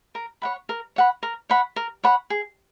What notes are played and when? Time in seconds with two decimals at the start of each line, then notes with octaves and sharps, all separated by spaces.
0.15 A#4
0.42 C#5 F#5 B5
0.69 A#4
0.96 C#5 F#5 B5
1.23 A#4
1.50 C#5 F#5 B5
1.76 A#4
2.04 C#5 F#5 B5
2.30 G#4